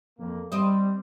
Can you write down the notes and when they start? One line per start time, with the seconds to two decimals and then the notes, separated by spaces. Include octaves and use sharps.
0.19 F2 A#3
0.52 G3 C4 D#5